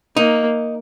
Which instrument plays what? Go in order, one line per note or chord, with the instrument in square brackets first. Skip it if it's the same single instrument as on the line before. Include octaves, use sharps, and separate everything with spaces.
[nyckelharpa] A#3 [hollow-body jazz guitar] D#4